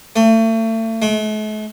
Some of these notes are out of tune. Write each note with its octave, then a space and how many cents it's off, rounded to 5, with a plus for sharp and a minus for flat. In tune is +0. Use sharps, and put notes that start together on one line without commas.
A3 +35
A3 -45